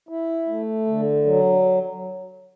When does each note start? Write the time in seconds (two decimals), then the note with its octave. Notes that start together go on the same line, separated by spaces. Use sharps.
0.09 E4
0.48 A3
0.87 D3
1.26 F#3